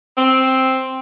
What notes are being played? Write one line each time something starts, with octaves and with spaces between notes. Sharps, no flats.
C4